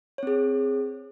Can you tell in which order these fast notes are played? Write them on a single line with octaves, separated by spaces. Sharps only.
C#5 C4 G#4